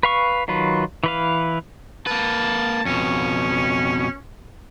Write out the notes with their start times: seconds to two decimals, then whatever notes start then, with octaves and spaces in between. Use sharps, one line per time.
0.03 B4 F5 C#6
0.48 D#3 F#3 F4 B4
1.04 E3 B4 F5
2.07 A#3 B4 A5
2.85 F2 B2 C#4